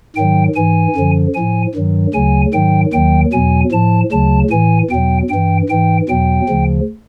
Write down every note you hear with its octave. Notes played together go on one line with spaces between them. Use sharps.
G#2 D#3 F#3 G5
G#2 E3 G#5
F#2 D3 F3
A2 F3 G#5
G2 D#3 F#3
D2 C#3 F#3 G#5
G#2 D#3 F#3 G5
D#2 D#3 F#3 G5
E2 B2 F#3 G#5
A2 F3 A5
D2 C#3 F#3 A5
A2 E3 G#5
E2 B2 F#3 G5
G2 E3 G5
G#2 E3 G5
E2 B2 F#3 G5
D2 C#3 F3